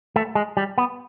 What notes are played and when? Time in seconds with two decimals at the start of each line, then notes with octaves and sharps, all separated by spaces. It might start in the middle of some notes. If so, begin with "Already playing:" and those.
0.16 A3
0.35 G#3
0.57 G3
0.78 B3